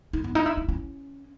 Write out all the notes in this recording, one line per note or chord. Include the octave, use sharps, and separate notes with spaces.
D#4
B3
D#4
E4
D#4
C#4